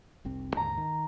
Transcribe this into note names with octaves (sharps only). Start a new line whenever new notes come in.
F1 C2 C4
D#2 G#2 D3 A#5
D#3